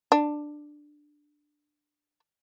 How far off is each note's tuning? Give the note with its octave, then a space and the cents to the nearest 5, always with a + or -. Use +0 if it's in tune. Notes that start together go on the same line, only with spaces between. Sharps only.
D4 +10